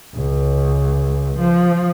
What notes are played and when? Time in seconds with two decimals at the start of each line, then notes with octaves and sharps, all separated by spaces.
0.15 C#2
1.39 F3